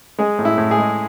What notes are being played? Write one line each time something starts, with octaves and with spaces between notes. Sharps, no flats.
G#3 G#4
A2
E4
A2
G#4
G#3